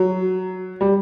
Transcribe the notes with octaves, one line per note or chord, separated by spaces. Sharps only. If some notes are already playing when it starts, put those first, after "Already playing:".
Already playing: F#3
G3